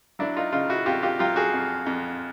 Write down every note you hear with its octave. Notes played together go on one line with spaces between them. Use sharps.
F#3 D4 E4
D#4 F4
C#3 D#4 F4
E4 F#4
F2 F4 G4
F4 G4
F#3 F4 G4
F#4 G#4
F2
F2